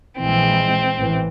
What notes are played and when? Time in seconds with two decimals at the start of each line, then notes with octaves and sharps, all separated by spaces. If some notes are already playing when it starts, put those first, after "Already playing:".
0.18 A#1 E3 G#3 C4
0.97 A1 E3